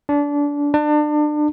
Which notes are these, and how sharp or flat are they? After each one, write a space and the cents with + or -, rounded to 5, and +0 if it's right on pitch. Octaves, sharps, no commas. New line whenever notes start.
D4 -25
D4 +30